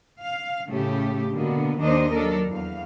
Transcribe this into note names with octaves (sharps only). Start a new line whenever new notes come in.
F5
A2 C#3 A3 C#4 G4
B2 D3 A#3 B3
D#2 D#3 D4 D#4 C5 D#5
F#3 D4 A4 A#4
E2 F5